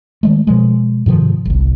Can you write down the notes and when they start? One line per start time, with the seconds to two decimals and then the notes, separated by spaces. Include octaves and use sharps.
0.23 D#3 G#3 A3
0.47 B2 F3 G#3
1.06 G#2 C3 D#3 F3
1.45 G1 C2